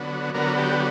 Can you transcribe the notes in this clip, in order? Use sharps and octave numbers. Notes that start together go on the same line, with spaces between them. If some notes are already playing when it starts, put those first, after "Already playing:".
Already playing: D3 F#3 B3
D3 F#3 B3 A#4
G4